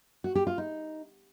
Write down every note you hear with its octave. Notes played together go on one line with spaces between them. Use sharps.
F#4
G4
F4
D#4